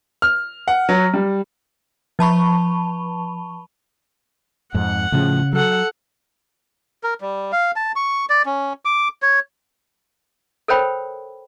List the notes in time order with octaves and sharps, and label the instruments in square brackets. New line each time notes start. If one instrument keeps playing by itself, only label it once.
[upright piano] F6
F#5
F#3
G3
[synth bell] F3 A5 B5 C#6
[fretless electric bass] F2 G#2 [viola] F#5
[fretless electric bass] A2 F3 [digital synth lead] C#3
[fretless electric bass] F#3 [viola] A4 F#5
[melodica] A#4
G3
F5
A5
C#6
D5
C#4
D6
C#5
[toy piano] A4 A#4 C5 C#5 G5 B5